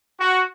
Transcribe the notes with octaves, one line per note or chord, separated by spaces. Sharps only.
F#4